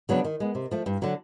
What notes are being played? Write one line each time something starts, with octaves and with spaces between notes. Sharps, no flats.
C#3 F#3 B3 D4
D#3
G#3 B3
C3
F3 A3
G2
D3 F#3